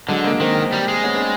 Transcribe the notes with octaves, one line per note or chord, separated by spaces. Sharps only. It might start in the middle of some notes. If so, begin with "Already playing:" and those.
D3 F#3 G#3
G#3 A#3
D#3 A#3 C4
G3
G#3
B3 C#4
C4 D4